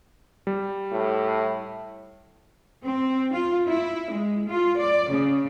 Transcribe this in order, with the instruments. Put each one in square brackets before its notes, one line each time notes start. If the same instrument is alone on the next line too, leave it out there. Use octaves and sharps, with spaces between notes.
[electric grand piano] G3
[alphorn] A2
[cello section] C4
F4
E4
G#3
F4
D5
C#3